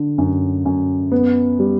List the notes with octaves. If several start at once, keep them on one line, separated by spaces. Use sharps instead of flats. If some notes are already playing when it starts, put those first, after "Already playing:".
Already playing: D3
F#2
F#2
B3
G3